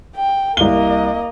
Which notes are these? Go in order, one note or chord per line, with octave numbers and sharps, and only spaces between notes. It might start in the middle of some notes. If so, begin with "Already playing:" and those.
G5
C2 A#3 D#5 G7